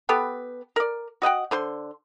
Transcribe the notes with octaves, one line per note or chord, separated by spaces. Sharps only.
B3 G4 A4 B4
A#4 D5
F#4 D#5 F#5 G5
D3 C5 C6